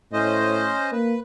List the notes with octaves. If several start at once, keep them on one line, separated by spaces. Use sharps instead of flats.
A2 C#4 C5 D#5
A#3 B4